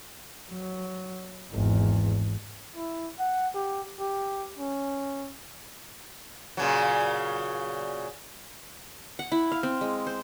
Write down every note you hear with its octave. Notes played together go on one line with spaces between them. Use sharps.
F#3
G#1 E2
E4
F#5
G4
G4
C#4
A#2 C#3 F#3
F#5
E4
F5
C4
G#3
C5